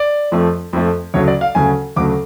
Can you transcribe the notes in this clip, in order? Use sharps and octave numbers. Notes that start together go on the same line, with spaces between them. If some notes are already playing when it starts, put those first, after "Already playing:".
Already playing: D5
F2 F3 A3
F2 F3 A3
D2 C#3 F#3 A3 C#5
D5
F5
D2 C#3 F#3 A3 G#5
D2 C#3 F#3 A3 D6